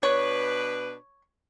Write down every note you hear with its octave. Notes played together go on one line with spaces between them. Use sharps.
B2 D4 B4 C#5